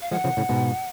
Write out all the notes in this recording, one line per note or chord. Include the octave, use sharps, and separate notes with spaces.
F5
F3 G#3 F#5
C#3 F3
A2 C#3
G#2 B2